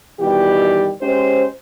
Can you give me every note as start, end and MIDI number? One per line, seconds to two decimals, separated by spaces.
0.20 0.91 47
0.20 0.91 51
0.20 0.91 52
0.20 0.91 55
0.20 0.91 67
1.02 1.47 56
1.02 1.47 61
1.02 1.47 67
1.02 1.47 72